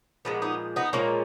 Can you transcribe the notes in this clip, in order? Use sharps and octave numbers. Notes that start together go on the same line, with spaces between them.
A#2 F3 G#3 B3
B3 D#4
B3 D#4
A#2 F3 G#3 A#3 C#4